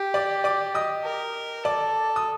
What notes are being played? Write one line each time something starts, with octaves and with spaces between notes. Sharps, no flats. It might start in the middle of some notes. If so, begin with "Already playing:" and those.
Already playing: G4
D5 D6
D5 D6
D#5 D#6
A#4
A4 D5 D6
D#6